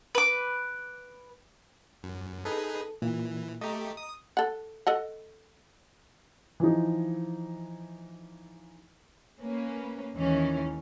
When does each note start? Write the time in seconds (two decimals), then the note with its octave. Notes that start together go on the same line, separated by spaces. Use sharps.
0.15 B4 D6
2.03 F#2
2.45 D#4 G#4 A4 B4
3.02 A#2 E3
3.61 A3 G4 D#5 A#5
3.97 D#6
4.37 A4 F#5
4.87 A4 D#5 F#5
6.60 E3 F3 D#4
9.41 A#3 C#4 B4
10.15 D#2 G#2 D#3 E3 C#4